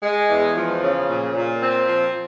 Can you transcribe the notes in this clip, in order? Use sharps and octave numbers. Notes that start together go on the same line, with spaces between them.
G#3
E2
F3
C#3
A#2
A#2
C4
F3